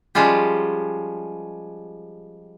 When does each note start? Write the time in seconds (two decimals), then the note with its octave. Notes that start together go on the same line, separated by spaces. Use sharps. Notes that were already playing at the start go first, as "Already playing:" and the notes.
0.15 F3 G3 G#3 C#4 F4 G4